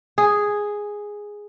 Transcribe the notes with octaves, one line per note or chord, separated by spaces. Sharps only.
G#4